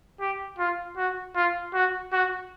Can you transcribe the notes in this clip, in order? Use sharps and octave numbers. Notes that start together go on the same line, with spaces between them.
G4
F4
F#4
F4
F#4
F#4